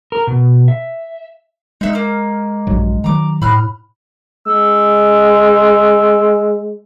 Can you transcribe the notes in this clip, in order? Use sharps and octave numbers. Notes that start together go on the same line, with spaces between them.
A#4
B2
E5
G#3 D#4 E5 F#6
A#3 F6
A#1 G2 F#3
D#3 F#3 A#5 D6
A2 B5 F6 F#6
G#3 E6